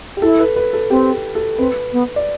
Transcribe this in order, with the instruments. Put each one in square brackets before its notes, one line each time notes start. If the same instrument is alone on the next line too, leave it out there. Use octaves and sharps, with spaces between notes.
[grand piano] G4
[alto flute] E4 [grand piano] A4
[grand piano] B4
B4
A4
[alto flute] C4 [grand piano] G4
[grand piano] G4
A4
[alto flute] C4 [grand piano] B4
[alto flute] B3
[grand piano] D5